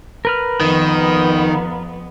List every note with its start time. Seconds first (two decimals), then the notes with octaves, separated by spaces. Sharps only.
0.25 A#4 B4 F6
0.60 F2 D#3 B3